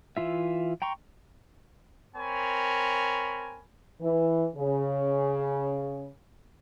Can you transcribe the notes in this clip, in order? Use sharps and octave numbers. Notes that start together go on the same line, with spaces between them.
E3 F4 E5
G5 A#5 C6 C#6
C4 A#4 C#5 G#5 B5
E3
C#3